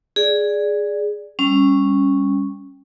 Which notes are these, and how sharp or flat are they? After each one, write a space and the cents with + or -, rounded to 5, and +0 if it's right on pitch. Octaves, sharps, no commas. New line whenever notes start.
G#4 +0 D5 +0
G3 +25 C#4 -5